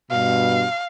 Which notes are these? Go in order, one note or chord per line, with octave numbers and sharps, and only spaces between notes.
G2 B2 F5